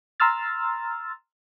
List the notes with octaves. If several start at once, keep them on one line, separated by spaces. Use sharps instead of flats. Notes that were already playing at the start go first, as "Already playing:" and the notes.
A#5 C6 E6 F6 A6